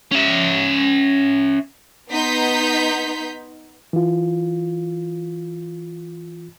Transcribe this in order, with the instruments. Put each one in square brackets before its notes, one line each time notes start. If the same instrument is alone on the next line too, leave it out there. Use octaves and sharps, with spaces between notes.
[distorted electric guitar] C#4 E5
[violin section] B3 D#4 A#5 C6 G6 B6
[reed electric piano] E3 F4